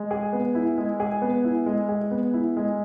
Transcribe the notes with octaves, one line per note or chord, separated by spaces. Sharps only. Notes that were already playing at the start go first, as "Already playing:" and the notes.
Already playing: G#3
G#4
B3
E4
G#3
G#4
B3
E4
G#3
G#4
B3
E4
G#3